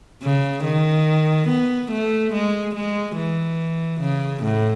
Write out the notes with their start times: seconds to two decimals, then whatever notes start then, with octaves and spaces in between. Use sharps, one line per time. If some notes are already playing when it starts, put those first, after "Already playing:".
0.23 C#3
0.64 D#3
1.48 B3
1.91 A3
2.33 G#3
2.75 G#3
3.17 E3
4.01 C#3
4.43 A2